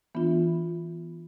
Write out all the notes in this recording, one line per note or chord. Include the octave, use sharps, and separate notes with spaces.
E3 B3 D4 F4